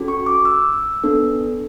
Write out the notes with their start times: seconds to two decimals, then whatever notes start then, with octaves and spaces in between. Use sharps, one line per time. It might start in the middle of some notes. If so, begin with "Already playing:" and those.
Already playing: C#4 F#4 A4
0.08 C#6
0.26 D6
0.45 E6
1.04 B3 D4 A4